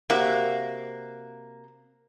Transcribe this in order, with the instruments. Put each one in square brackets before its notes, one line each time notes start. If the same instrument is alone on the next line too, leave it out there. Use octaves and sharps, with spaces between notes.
[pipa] C3 F#4 [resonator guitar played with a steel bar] A#3